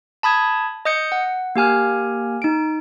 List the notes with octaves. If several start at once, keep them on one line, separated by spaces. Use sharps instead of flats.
A5 B5 D#6 G#6
D#5 D#6 G6 C#7
F#5
A#3 G4 G#5 F6
D#4 D7